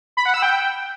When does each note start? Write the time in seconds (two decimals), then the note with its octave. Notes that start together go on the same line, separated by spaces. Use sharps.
0.17 B5
0.25 F#5
0.34 E6
0.42 G5